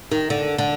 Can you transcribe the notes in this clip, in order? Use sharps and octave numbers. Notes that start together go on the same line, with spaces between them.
D#3
D3
D3